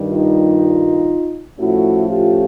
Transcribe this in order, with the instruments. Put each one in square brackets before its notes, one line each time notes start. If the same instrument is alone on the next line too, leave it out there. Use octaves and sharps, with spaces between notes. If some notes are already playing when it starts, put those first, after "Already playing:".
Already playing: [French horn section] G2 D#3 G3
D#4 F4
A2 F3 A3 C#4 E4 F#4
F4 G4